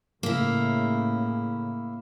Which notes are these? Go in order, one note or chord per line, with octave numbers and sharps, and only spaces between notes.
A2 C#3 A#3 E4